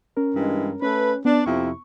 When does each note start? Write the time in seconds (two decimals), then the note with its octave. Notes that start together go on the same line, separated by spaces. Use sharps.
0.17 C#4 A#4
0.34 G2 E3 G#3
0.82 A3 C#4 B4
1.25 B3 D4
1.45 F2 C3 E4 C#6